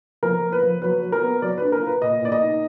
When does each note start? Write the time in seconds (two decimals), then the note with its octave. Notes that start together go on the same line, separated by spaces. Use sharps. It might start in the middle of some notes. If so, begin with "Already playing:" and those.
0.23 F3 A#4
0.42 A#3
0.52 B4
0.62 F3
0.82 F#3 B4
1.02 F#3
1.12 A#4
1.22 B3
1.42 F#3 D5
1.58 D4 B4
1.72 A#4
1.82 F4 B4
2.02 A#2 D#5
2.22 A#2 D5
2.32 D#5
2.42 D#4